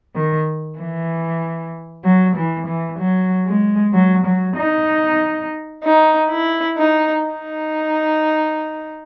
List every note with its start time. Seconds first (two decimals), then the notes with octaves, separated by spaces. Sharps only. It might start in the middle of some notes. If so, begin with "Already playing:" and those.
0.15 D#3
0.78 E3
2.04 F#3
2.35 E3
2.67 E3
2.99 F#3
3.46 G#3
3.93 F#3
4.25 F#3
4.56 D#4
5.83 D#4
6.30 E4
6.77 D#4
7.25 D#4